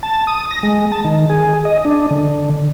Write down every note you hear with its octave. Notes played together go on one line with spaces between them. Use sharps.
A5
D#6
A#6
G#3
A5
D#3
G#4
D#5
D4
D3